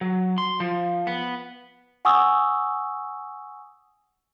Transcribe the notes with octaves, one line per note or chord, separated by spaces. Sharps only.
F#3
C6
F3
B3
F#5 G#5 C#6 D#6 E6